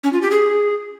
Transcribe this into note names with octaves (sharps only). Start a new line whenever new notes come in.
C#4
F4
G4
G#4